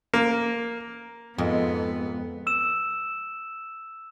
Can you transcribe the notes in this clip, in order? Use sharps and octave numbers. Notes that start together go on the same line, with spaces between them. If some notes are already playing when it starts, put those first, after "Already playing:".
A#3
F2 G#2 B3 A4
E6 E7